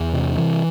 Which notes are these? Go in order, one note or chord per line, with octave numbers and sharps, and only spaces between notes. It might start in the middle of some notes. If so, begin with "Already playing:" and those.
Already playing: E2
C3
E3